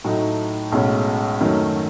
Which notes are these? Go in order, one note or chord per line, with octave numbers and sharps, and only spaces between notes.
A2 F#3 A3 D#4
B1 A2 G#3 C#4
F#2 D#3 F#3 A3 C#4